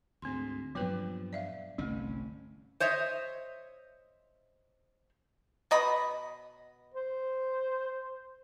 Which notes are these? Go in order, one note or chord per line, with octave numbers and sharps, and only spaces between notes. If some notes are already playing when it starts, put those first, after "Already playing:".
D2 G#2 C4 C6
G2 A#2 F3 F#3 B3 B4
D5 E5 F5
G1 C2 G3 A3 C#4
C5 C#5 D#5 E5
B2 D#5 B5
C5